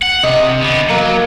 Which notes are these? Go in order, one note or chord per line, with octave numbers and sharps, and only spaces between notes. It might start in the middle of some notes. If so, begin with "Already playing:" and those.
F#5
C3 D#5
D3 B3
F#3 A#3